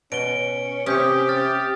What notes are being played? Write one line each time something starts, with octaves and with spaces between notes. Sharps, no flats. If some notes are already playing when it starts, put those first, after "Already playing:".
B2 C#4 D7 G7
C3 C#4 G4 D#6 G6 B6
F6 A6